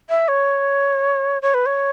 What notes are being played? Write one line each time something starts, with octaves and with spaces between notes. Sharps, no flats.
E5
C#5
C#5
B4
C#5